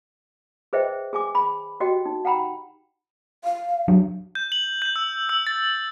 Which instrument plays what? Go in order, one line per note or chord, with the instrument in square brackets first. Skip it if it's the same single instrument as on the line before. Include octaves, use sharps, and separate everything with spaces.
[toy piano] G#4 B4 C5 D#5 E5 G5
G#4 G#5 D6
B5
F#4 G4 D#5 G5
D#4
F#5 G5 A#5 B5
[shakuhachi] F5
[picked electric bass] F#3 D4
[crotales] G6
F#7
G6
E6
E6
A6